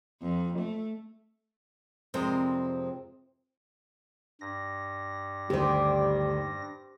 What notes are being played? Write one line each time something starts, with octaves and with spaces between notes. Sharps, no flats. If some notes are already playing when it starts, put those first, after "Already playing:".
F2
A3
F2 C3 G3 G#3 C4 A#4
G2 A#6
D2 D#3 G3 G4 C5